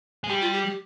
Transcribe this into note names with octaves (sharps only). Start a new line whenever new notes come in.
G#3
G3 G4
F4
G4
G4